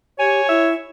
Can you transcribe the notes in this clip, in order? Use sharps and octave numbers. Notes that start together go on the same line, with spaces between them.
G4 C#5 G#5
E4 E5